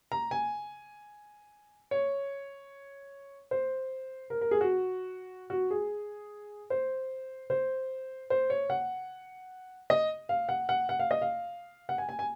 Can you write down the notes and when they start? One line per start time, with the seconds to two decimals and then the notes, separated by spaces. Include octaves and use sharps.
0.12 A#5
0.31 G#5
1.91 C#5
3.51 C5
4.30 A#4
4.41 A#4
4.51 G#4
4.61 F#4
5.50 F#4
5.71 G#4
6.70 C5
7.50 C5
8.30 C5
8.50 C#5
8.70 F#5
9.90 D#5
10.29 F5
10.49 F#5
10.69 F#5
10.89 F#5
10.99 F5
11.11 D#5
11.22 F5
11.89 F#5
11.98 G#5
12.09 G#5
12.19 G#5